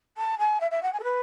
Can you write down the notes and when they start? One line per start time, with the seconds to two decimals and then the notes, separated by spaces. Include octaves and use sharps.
0.17 A5
0.38 G#5
0.60 E5
0.71 E5
0.82 F#5
0.93 G#5
0.99 A4
1.03 B4